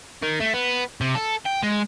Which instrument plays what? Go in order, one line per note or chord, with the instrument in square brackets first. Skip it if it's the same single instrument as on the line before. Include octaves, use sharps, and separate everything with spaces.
[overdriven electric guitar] D#3
A3
B3
C3
A4
G5
G#3